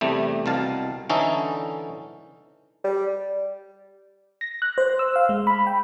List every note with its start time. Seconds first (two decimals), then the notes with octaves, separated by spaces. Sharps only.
0.01 E2 C3 G3 A3
0.46 C2 B2 F5 A5
1.09 D3 E3 C#4 D#4 A4
2.84 G3
4.41 A#6
4.62 F#6
4.78 C5
4.99 E6
5.16 F5
5.29 G#3
5.47 B5
5.67 G5